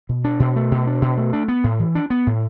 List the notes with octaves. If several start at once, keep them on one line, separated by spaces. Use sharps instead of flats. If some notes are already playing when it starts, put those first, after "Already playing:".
B2
D4
B2
A3
B2
D4
B2
A3
D4
B3
A2
E3
D4
B3
A2